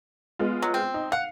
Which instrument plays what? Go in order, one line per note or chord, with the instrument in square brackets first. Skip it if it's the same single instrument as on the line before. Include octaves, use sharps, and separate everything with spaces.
[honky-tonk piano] G#3 B3 F4
[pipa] F#3
C4
[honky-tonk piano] D#4
[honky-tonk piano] F5 [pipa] F#5